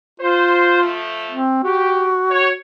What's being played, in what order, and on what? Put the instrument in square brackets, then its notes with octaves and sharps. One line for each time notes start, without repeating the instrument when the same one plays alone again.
[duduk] F4 [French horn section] C5
[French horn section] F3 A3
[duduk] C4
[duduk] F#4 [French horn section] G4
[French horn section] C#5